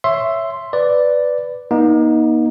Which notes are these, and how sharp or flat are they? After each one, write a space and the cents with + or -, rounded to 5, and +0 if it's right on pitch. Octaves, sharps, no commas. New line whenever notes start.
C#5 +0 E5 +10 C6 +0
B4 +10 D5 +0
A#3 +45 D#4 +5